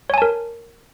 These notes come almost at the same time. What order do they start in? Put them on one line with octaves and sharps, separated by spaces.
C#5 G#5 A5 A#4